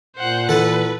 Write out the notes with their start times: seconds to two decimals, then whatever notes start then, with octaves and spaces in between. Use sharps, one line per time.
0.17 A#2 C5 F#5
0.49 E3 A4 B4 F#5 A5